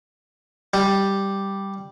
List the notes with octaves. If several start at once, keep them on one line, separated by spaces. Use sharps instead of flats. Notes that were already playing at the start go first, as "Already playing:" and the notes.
G3